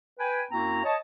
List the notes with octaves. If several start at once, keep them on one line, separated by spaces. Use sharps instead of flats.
B4 G5 G#5
F#2 A#3 C4 E4 F#4 A#5
C#5 D#5 A5